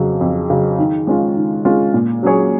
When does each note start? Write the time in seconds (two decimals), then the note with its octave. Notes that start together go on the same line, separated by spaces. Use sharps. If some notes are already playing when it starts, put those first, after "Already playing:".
Already playing: F2 C#3 F#3
0.21 F2
0.50 C#3 F#3
0.78 D#3
1.07 G#3 C#4 F4
1.37 D#3
1.65 G#3 C#4 F4
1.94 A#2
2.23 F#3 C#4 G#4 C#5